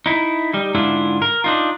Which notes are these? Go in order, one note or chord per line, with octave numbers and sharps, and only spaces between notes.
D#4 E4
G3 D#4
G#2 D3 D4 E4 F4
A#4
D4 D#4 F4